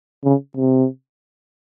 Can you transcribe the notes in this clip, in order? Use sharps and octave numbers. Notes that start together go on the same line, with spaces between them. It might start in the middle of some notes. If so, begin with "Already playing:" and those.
C#3
C3